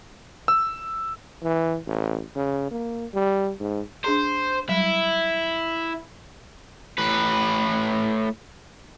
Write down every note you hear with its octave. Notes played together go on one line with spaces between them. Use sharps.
E6
E3
A1
C#3
A#3
G3
G#2
D4 G#4 C5 A#5
F#3 G3 E4
A2 B4